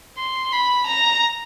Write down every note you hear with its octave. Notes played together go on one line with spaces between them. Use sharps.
C6
B5
A#5